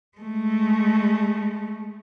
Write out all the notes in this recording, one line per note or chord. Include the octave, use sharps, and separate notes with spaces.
G#3 A3